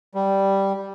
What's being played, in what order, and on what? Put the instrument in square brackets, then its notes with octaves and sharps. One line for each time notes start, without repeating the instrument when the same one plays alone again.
[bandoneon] G3